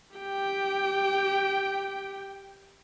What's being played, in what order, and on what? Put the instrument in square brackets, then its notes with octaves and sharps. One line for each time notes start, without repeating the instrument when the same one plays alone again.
[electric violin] G4 G5